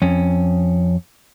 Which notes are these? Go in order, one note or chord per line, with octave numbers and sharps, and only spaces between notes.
F2 C#4